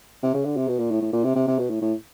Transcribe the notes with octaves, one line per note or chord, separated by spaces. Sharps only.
C3
C#3
D3
C3
B2
A#2
A2
A2
A#2
C3
C3
C3
B2
A2
A2